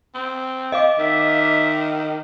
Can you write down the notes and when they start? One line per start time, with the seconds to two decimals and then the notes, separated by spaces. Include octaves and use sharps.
0.15 C4
0.72 D#5 F5 D6
0.99 D#3 E5